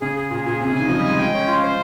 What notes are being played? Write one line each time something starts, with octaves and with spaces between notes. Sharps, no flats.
C#3 G#4
G#4
A#2 G#4
A#2 G#4
C3 G#4
C#3
D#3 G#5
F3 D#5
G3
G#3 G#5
G#3 G5
C#4
F4
C5